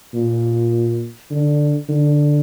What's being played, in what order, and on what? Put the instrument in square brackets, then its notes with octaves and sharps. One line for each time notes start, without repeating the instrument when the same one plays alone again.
[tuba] A#2
D3
D3